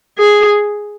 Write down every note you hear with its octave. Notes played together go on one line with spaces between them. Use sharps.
G#4